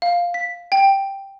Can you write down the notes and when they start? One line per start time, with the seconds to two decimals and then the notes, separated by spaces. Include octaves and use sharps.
0.02 F5
0.34 B6
0.72 G5